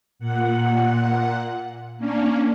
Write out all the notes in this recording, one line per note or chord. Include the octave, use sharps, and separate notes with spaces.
A#2 F#5
A#3 C#4 D4